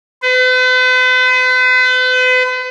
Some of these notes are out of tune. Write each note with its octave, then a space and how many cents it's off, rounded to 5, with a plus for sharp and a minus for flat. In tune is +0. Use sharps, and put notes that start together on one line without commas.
B4 +45